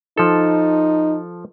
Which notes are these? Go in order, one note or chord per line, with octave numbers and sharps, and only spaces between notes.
F3 D#4 A4